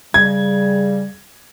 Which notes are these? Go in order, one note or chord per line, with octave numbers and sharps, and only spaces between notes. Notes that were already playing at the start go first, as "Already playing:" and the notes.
C#3 G3 G#6